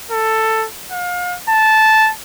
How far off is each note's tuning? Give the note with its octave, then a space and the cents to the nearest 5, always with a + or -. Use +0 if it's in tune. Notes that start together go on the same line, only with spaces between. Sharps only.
A4 +10
F5 +35
A5 -10